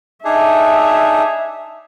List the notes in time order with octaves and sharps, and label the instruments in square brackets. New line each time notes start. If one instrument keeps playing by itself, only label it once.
[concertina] D4 D#4 G#4 [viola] E5